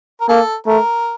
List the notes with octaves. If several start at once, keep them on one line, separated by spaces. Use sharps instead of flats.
A#4
A#3 A4
A3 A#4